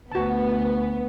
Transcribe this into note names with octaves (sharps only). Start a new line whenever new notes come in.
D2 B3 F#4 A5